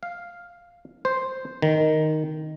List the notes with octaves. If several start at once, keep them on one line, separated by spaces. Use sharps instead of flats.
F5
C5
D#3